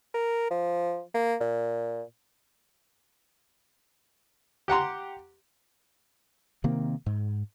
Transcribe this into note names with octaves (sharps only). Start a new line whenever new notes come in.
A#4
F3
A#3
A#2
G4 F#5 A#5 C6
C3 D#3 A#3 C4
G#2